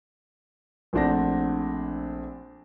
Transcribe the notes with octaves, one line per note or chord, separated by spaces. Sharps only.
A#1 A3 C4 D4 F#5 A#6